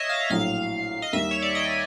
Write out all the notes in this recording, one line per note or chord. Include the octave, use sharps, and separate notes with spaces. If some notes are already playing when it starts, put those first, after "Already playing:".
Already playing: C#5 D#5 E5
F5
A#1 A2 F#3 F5
D#5
D#2 D#3 G3 E5
C#5
D5
D#5